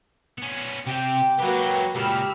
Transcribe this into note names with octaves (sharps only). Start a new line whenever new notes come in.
B3 C#4
C3 G4 C5 G5
F#3 A#3 F#4 G4 B4
C#2 A#2 G4 B5 E6 F6